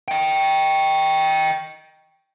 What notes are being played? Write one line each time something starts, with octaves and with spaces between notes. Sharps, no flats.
D#5 G5